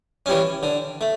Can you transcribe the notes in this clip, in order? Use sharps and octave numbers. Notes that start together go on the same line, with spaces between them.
E3 G3 C#4
D3
A3